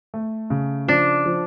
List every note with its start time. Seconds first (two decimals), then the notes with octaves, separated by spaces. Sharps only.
0.14 A3
0.50 C#3
0.88 F3 D4
1.26 F3